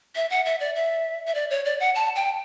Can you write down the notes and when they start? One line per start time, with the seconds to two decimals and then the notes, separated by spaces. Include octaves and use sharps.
0.16 E5
0.30 F#5
0.45 E5
0.60 D5
0.75 E5
1.27 E5
1.35 D5
1.50 C#5
1.65 D5
1.80 F#5
1.95 A5
2.16 G5